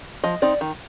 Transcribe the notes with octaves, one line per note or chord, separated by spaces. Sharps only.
F3 D#5
C4 D#4 D5
D#3